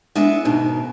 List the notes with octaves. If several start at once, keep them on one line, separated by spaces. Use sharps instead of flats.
G#3 B3 D4 E4 E5
G#2 B2 D#3